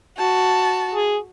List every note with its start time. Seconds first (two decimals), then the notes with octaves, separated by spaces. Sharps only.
0.18 F#4 A5
0.95 G#4